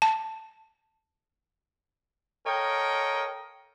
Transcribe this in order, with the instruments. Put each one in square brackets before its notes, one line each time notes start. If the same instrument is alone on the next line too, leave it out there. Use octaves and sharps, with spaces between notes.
[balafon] A5
[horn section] A4 A#4 C#5 D#5 F5 G5